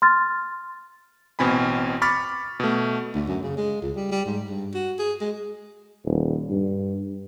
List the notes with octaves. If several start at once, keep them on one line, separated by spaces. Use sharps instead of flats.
C6 F6 A6
A1 B2 C4 G#5 B5
B5 C#6 D6 F6 A6
B2 A3
D2
F#2
C#3
G#3
C#2
G3
G3
G#2
G2
F#4
G#4
G#3
D#1
G2